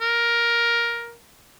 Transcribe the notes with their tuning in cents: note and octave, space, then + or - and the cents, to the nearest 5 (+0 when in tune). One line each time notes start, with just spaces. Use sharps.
A#4 +10